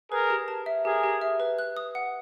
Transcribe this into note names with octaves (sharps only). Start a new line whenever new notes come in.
G#4 A#4 B4
G4
A5
E5
G4 G#4 A#4
G4
E5
B4
F#6
D#6
F#5